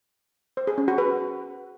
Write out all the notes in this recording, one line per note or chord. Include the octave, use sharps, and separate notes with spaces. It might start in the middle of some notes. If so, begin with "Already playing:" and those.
C5
G#4
C#4
F#4
B4